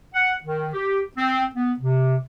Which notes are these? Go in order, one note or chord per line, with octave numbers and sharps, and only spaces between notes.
F#5
D#3
G4
C4
B3
C3